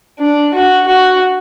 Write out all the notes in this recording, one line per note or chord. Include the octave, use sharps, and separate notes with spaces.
D4
F#4
F#4